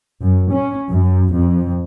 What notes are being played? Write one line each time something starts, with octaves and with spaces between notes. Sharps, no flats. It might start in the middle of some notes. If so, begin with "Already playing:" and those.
F#2
C#4
F#2
F2